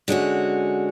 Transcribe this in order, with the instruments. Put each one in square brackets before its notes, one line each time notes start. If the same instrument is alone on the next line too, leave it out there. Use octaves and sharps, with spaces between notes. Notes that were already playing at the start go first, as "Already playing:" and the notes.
[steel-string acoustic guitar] D3 G#3 C#4 F#4